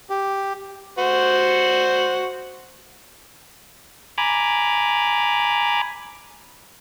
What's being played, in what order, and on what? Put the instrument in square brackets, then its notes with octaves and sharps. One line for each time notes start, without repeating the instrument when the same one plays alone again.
[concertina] G4
[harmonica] F#4 C5 F#5
[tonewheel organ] G#5 A#5 B5 D6